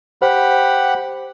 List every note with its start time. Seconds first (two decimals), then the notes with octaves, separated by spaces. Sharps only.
0.22 G4 C5 F#5 B5